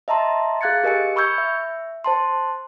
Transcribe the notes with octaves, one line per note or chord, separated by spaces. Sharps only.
D#5 E5 A5 A#5 C6
G#4 F5 F#6 G#6 A6 C#7
G4 A#4 D#5 G#5 C#7
B5 C#6 E6 G6 G#6 C#7
E5
C5 A5 C6